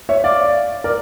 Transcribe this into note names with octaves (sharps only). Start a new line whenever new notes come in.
C#5 E5
D5 F5
A#4 D5